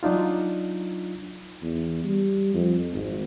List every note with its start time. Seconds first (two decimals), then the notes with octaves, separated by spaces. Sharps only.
0.03 F#3 D4 D#4 F4
1.62 E2
2.04 G3
2.54 F2
2.92 G#1